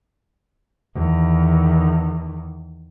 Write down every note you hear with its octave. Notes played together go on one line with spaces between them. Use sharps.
E2 D#3